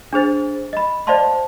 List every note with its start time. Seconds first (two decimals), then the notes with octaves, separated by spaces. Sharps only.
0.13 D4 G#4 C5 A6
0.73 D#5 B5
1.07 C5 D5 D#5 F5 A5 C6